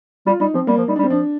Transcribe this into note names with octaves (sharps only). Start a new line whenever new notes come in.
G3 F4
G3 D#4
F3 C4
G3 A#3
F3
G3 D#4
D4
G3
C4
F3 D4